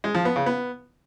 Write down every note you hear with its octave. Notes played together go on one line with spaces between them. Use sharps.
G#3
F3
B3
C#3
B3